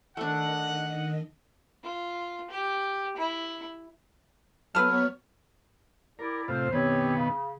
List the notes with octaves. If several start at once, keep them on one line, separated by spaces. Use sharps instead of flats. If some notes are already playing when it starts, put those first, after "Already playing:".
D#3 A3 D4 D#5 F#5
F4
G4
E4
F#3 B3 A4 B4 C#5 F6
E4 G4 A#4 D5
A2 C3 F4 C5
B2 D#3 B3 C4 G4 C#5
C#3